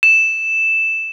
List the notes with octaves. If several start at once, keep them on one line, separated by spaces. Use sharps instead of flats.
E7